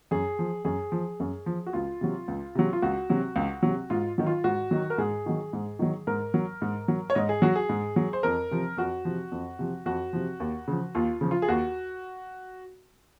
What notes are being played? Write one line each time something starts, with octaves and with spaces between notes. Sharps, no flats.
F#2 G#4
F3
F#2 G#4
F3
F#2
F3
F#4
C#2 F4
C3 F#3
C#2
C3 F#3
F4
C#2 F#4
C3 F#3
C#2
C3 F#3
G#2 F4
D#3 F#3
F4
G#2 F#4
D#3 F#3
A#4
G#2 G#4
D#3 F#3
G#2
D#3 F#3
G#2 A#4
F#3
G#2
F#3
C#5
G#2 D#5
G#4
F#3 F#4
G#4
G#2
F#3
C5
F2 A#4
C3 F3
F2 F#4
C3 F3
F2
C3 F3
F2 F#4
C3 F3
D#2
C#3 F3
D#2 F4
C#3 F3
F4
G#4
D#2 F#4